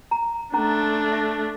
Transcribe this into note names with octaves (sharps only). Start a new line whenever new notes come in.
A#5
A3 C#4 D4 A#5
E5